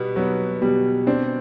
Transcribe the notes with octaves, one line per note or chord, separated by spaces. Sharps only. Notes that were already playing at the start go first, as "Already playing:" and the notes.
Already playing: B2 G3 B3
F#3 B3
B2 G3
C4 D4